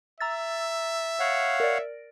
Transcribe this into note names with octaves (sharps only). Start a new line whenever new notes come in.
E5 A#5 E6 A6
C#5 F5 F#5
A#4 D5